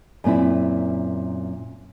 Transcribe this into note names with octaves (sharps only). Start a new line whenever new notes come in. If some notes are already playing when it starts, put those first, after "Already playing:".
F#2 A#2 C4 E4